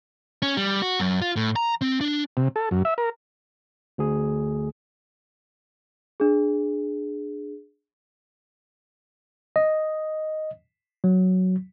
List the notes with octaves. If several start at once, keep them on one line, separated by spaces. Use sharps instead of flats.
C#4
G3
F#4
F#2
F4
A2
A#5
C4
D4
C3
A4
F#2
E5
A#4
D2 G#4
D4 G#4
D#5
F#3